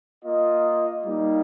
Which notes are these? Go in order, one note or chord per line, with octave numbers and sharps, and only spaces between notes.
A#3 F4 D#5
G3 A#3 D#4